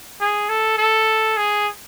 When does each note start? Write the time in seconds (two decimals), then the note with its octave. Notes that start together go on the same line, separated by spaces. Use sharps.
0.21 G#4
0.49 A4
0.78 A4
1.37 G#4